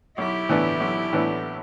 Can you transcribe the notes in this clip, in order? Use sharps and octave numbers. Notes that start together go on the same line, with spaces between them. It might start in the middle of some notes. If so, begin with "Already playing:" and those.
B1 E4 G4
A2 E3 B3 D4
B1
A2 E3 B3 D4